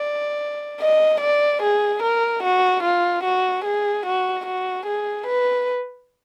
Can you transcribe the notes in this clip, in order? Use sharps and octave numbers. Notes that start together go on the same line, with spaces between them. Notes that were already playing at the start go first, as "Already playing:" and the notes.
Already playing: D5
D#5
D5
G#4
A#4
F#4
F4
F#4
G#4
F#4
F#4
G#4
B4